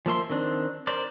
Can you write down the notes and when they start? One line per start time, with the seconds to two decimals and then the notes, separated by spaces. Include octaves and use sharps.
0.06 F3 A#3 E5 C6
0.30 D#3 C4 D4
0.87 A#4 C5 D5